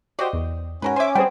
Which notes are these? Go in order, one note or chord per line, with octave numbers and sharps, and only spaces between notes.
F#4 G4 C5 D5 D#5
E2
G#2 C#4 F#4 A#4 B4
C5 E5 G#5 D6
G3 B3 G#4 C5 G5